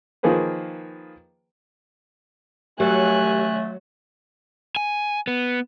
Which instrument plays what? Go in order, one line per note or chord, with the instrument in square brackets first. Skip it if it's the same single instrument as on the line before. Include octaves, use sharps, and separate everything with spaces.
[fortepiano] D#3 F3 A#3 G#4 B4 C5
[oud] F#3 [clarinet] A3 [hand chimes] G4 A#4 [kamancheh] G#5 F#6
[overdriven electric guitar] G#5
B3